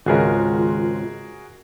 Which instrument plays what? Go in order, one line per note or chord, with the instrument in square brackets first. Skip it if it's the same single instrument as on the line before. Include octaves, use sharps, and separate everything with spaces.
[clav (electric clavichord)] G#1 C#2 [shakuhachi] F4 [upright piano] F#4 G#4 A#4